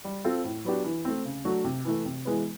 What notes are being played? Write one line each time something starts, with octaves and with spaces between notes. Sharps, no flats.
G3
C4 F4 A4
A2
F#3 B3 D4 G4
E3
A3 C4
C#3
F#3 A3 D4 F#4
C3
E3 A3
C3
E3 G#3 B3